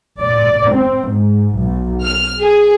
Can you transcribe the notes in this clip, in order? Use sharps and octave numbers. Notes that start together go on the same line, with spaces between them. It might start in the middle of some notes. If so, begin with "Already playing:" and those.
D5
C4
G#2
B1
F6
G#4